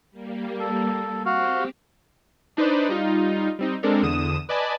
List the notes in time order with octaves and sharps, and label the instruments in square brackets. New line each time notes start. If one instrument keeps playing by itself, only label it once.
[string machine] G3 A#3
[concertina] A4
[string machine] C4 G4 [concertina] F#4 F5
[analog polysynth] D4 D#4 B4 C5 D5
G3 D#4 F4
G3 C4 D#4
G#3 C4 D4 A4 A#4
E2 D3 D#6 D#7 E7
B4 D5 D#5 G#5 A5 B5